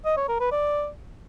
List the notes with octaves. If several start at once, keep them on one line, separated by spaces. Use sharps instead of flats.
D#5
C#5
A#4
B4
D5